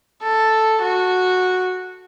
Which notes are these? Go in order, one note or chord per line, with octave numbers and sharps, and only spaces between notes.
A4
F#4